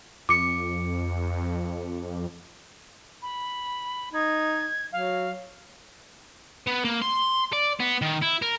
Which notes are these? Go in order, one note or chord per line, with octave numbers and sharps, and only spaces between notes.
F2 D6 C#7
B5
D#4 G#6
F#3 F5
B3
A#3
C6
D5
B3
D#3
E4
A#4